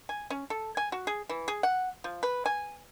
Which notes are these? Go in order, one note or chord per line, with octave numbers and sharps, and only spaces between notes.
G#5
C#4
A4
G#5
F#4
G#4
E3
G#4
F#5
F3
B4
G#5